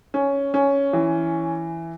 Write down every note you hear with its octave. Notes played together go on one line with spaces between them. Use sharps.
C#4
C#4
E3